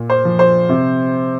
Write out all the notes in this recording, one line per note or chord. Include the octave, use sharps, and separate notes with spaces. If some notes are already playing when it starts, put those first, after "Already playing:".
Already playing: A#2
C5
F3
C5
C3